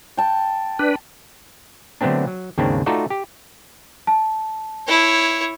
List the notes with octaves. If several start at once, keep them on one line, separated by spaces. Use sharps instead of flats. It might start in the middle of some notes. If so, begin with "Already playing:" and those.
G5 A5
D4 B4
D3 F#3 A3 B3 C4 D4
F#3
D#2 G#2 C#3 A#3 C4 D4
A3 D#4 F4 F#4 A4 D5
G4
A5
E4 C#5